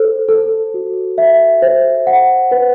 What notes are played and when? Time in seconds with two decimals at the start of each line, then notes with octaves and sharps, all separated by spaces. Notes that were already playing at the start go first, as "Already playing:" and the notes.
Already playing: A4 C5
0.29 A4
0.74 F#4
1.18 E5
1.62 C5
2.07 F#5
2.51 B4